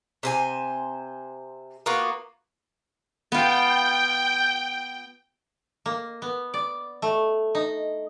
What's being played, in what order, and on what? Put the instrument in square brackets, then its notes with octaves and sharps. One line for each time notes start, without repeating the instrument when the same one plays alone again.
[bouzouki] C3 C5 G#5
A#3 B3 F4 F#4
[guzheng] B3 F4 [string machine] G5
[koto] A#3
B3
D5
A3
D#4